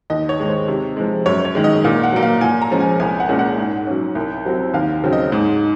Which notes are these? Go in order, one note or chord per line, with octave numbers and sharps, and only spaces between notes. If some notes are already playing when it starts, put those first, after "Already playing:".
D#2 D#5
C#5
D#3 G#3
C5
C3
F3 G#3
F#2 C#5
C#5
D#3 G#3
D#5
A#2 F5
F#5
F#3 A#3
F5
A#2 G#5
A#5
F3 G#3 C#4
G#5
C2 G#5
F#5
A#2 G#3 C#4
F#5
G#2
F#3 C#4
C2
C3 F#3 C4
D#2 F5
C#3 F#3 C4
D#5
G#2